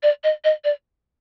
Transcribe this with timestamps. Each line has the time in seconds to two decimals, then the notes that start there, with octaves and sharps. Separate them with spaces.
0.03 D5
0.23 D#5
0.44 D#5
0.64 D5